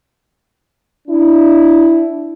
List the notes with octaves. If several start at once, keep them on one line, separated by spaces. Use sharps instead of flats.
D4 E4